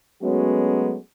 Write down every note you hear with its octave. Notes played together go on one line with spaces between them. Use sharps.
F#3 G#3 A3 B3 C#4 F#4